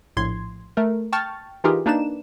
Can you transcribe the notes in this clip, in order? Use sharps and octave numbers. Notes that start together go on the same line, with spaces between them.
A#1 A2 C6 G#6
A3 A#4
G5 A5 C#6 F6 A6
E3 D#4 F4 G4 G#4 A#4
A#3 D4 D#4 B4 D5 E7